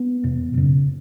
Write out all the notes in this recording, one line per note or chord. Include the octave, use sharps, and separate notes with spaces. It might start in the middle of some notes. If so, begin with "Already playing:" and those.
Already playing: B3
E2 B2
F#2 C#3